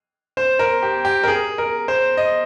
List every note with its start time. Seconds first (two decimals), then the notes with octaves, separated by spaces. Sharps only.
0.37 C5
0.59 A#4
0.82 G4
1.05 G4
1.23 A#4
1.28 G#4
1.58 A#4
1.88 C5
2.17 D#5